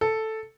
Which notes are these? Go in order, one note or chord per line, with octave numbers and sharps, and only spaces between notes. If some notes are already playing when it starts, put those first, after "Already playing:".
A4